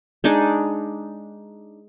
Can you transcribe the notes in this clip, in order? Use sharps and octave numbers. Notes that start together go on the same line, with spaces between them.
G#3 D4 D#4 D5